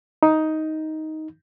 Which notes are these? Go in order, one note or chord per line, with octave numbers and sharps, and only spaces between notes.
D#4